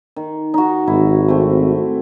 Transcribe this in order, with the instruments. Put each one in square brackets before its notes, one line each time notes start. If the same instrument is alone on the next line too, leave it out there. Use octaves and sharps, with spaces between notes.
[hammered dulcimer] D#3
D#4 F#4
[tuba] G#1 [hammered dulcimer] E4
[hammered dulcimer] A3 C4